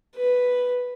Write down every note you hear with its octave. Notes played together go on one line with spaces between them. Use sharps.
B4